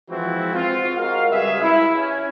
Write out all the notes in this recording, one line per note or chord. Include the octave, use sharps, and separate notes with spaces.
E3 F3 G#3 C4 E4 F#4
C4 F4
G#3 F#4 A#4 F5
C#3 G3 G#3 G#4 B4 E5
E4
C#4